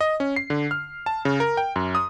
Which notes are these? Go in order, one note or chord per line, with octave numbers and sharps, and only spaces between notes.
D#5
C#4
C7
D3
F6
A5
C#3
A#4
G5
F#2
D#6